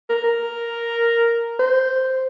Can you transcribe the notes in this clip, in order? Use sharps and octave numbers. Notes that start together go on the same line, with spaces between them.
A#4
A#4
C5